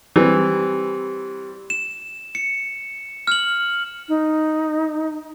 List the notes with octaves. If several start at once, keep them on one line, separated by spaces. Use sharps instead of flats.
E3 G3 C4
E7
C#7
F6 F#7
D#4